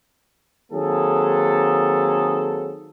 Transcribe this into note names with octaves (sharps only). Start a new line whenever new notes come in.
D#3 F#3 A#3 C4 G#4 A4